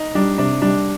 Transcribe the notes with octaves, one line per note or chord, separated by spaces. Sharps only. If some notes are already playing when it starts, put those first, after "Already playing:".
Already playing: D#4
G3 D4
C3 D4
G3 D4